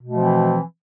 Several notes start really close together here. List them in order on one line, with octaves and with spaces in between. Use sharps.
B2 A3 F3 C4 E3